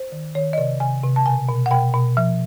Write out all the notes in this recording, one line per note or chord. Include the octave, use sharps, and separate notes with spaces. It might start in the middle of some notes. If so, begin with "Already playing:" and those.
Already playing: C5
D#3
D#3 C#5
D#5
C3 D5
C3 G#5
C3
A5
B2 G#5
B2
F#5
B2 G5
B2
F3